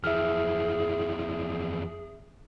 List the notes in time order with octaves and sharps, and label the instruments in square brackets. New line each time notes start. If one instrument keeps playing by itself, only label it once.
[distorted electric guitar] F2 E3 [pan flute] G#4 [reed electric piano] E5 F6